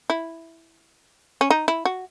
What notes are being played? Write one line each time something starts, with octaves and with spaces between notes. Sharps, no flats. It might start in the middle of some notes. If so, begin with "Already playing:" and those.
E4
C#4
D#4
E4
F#4